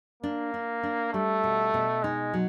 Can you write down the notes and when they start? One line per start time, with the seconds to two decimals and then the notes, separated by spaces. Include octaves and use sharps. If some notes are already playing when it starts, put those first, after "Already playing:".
0.23 A#3 D4
0.54 D4
0.83 D4
1.13 G3 A3
1.44 B2
1.74 B2
2.03 G#3 D#4
2.34 F#3